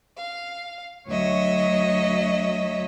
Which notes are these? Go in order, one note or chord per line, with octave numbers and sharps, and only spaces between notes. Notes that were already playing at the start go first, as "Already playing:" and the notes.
F5
D2 F#3 C#5 D#5 E5